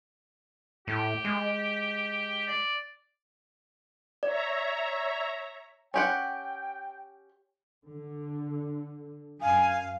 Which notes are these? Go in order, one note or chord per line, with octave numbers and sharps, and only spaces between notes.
A2 G4
G#3
D5
C#5 D5 E5 A#5
C#4 G4 F#5 G5
D3
F#2 F5 G#5